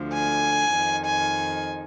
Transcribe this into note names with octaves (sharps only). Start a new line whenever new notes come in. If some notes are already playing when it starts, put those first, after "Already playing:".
Already playing: D2 D3 F3
G#5
F2 D#3
G#5